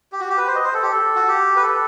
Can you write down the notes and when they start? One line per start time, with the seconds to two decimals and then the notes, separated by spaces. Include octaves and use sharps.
0.12 G4
0.20 F#4
0.30 G4
0.38 B4
0.47 C5
0.55 D#5
0.64 C5
0.74 A4
0.83 G4
0.92 A4
1.16 F#4
1.28 G4
1.56 B4
1.62 A4